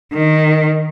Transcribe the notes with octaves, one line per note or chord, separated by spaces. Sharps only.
D#3